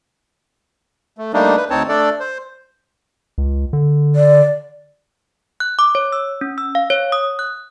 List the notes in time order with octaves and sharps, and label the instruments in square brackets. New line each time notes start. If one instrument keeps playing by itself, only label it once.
[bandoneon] A3
G3 A3 A#3 D4 D#4
B4
D2 C4 D#4 C#5 A5
A3 D4 A4 D5
C5
[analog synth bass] C#2
D3
[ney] D5
[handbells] F#6
D6
C#5
E6
C#4
E6
F5
C#5
D#6
F#6